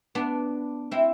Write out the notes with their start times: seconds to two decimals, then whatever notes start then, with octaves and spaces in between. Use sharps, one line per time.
0.15 B3 D4
0.91 C4 E4